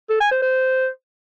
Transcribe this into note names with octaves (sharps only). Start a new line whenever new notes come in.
A4
G#5
C5
C5